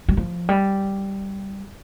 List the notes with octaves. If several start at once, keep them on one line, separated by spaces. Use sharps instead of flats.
G3
F3
G3